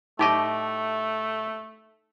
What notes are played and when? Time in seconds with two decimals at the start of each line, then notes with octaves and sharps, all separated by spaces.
0.19 A2 A3 D#4 G4 D#5 D6